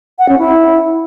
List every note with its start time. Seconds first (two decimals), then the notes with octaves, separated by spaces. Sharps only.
0.19 F#5
0.29 C#4
0.39 E4